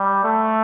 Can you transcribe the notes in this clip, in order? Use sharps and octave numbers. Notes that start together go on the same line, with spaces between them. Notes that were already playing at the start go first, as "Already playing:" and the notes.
Already playing: G3
A3